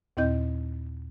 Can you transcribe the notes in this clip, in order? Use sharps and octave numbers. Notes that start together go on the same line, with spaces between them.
D#2 A#2 C4 E4 D#5 G6